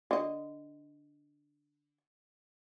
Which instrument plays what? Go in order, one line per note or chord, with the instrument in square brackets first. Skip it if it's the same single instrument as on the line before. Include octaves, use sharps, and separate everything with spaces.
[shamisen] D3 D#5